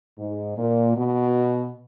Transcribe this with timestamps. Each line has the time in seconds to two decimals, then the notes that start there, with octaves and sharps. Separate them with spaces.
0.18 G#2
0.57 A#2
0.96 B2